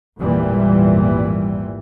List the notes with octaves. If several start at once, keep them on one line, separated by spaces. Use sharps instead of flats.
G#1 E2 A#2 E3 G3